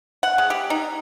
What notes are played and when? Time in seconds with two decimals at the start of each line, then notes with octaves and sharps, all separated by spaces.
0.23 F#5
0.38 G#3
0.50 G4
0.70 D#4